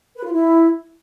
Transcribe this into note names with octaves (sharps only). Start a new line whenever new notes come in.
B4
F4
E4